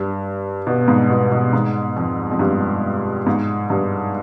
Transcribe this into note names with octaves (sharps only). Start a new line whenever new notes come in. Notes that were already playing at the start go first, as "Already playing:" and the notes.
Already playing: G2
B2
G#2
B2
B2
G#2
F2
F2
G2
G#2
G2